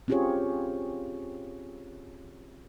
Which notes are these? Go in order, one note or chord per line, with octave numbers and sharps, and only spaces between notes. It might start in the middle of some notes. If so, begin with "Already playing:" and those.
C4 C#4 F4 G4 G#4 C#5